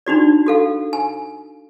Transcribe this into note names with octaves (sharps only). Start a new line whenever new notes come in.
D4 D#4 F#4 D5
F#4 A4 F5
G#5